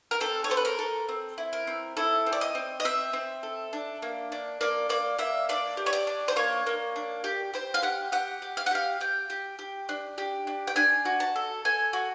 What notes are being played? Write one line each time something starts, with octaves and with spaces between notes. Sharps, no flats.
A#4
C4 A4
C#5
A4 C5
B4
A#4
A4
C4
E4
A#4
C4
E4 A4
C4
D5
D#5
C4
D#5
C4 E5
C4
A4
D4
A#3
D4
A#3 D5
A#3 D5
A#3 E5
D4 D5
G4
C#5
D5
D4
C5
A#3 C#5
A#3
D4
G4
G4 C5
F5
G4 F#5
G4 F#5
G4
F5
F#5
G4 F5
G4 G5
G4
G4
D4
G4
D4
G5
D4 G#5
F#4
A5
A4
A4 G#5
F#4